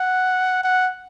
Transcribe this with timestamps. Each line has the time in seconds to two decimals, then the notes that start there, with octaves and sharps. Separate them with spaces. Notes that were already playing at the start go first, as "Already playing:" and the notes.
Already playing: F#5
0.64 F#5